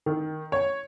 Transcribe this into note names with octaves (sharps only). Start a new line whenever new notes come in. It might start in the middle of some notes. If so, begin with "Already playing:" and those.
D#3
C#5